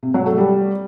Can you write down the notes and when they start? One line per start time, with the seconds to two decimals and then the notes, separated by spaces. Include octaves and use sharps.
0.03 C3
0.14 F#3
0.26 A3
0.38 G3